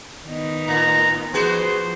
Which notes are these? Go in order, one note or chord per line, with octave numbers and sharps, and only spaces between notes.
D#3 B3 D#4
A2 A#5
F3 B3 F#4 G#4 C5